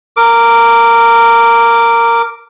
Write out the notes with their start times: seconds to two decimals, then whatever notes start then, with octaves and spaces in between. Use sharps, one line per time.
0.17 A#4 D6